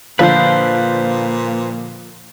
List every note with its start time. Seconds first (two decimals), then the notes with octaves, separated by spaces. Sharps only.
0.19 A#2 D3 F3 B4 C5 F5